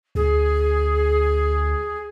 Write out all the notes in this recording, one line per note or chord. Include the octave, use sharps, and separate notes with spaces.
D2 G#4